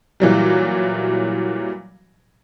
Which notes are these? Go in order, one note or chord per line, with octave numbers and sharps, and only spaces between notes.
A#2 E3 F#3 G3